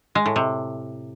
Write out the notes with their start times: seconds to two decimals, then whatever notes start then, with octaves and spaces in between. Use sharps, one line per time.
0.15 G#3
0.26 A2
0.36 C3